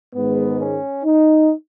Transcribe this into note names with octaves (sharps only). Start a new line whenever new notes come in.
G#2 D#3 G#3 B3
C#4
D#4